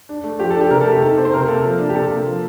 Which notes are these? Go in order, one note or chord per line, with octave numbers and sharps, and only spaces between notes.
D4
A3
F3 G4
A4
D4
G4
C3 A#4
A4
A3
G4
D#4 A4
C4
C5
C3 A#4
A#3 A4
F3
D4
G4
C3 A4
A#3
F3